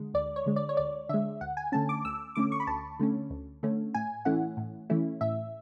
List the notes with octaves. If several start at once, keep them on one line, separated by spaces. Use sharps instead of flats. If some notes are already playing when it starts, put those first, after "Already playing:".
Already playing: D3 G#3
D2 D5
C#5
D3 G#3
D5
C#5
D2 D5
D3 G#3 E5
D2 F#5
G#5
D3 A3 C#4 A5
D6
D2 E6
D3 A3 C#4 D6
C#6
B5
D2 A5
D3 A3 C#4
D2
D3 A3 C#4
A2 G#5
E3 A3 C#4 E4 F#5
A2
E3 A3 C#4 E4
A2 E5